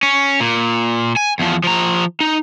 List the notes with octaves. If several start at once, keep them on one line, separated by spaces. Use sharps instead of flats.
C#4
A#2
G#5
E2 F3
F3 A#5
D#4